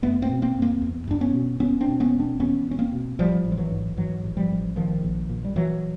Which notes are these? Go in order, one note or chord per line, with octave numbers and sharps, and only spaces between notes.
F#1 A3 B3
A#3 C4
B2
A#3 C4
F#1
A#3 C4
E2
F#1 D4
B3 C#4
B2
E1 B3 C#4
C4 D4
B2
B3 C#4
E1
C4 D4
E2 B3 C#4
E1 C#4
A#3 C4
B2
A1 F3 G3
A1
F3
E3 F#3
G#2
G#2 E3 F#3
A1
F3 G3
A1
A#1 D#3 F3
A#1
A#2
G3
A#2 E3 F#3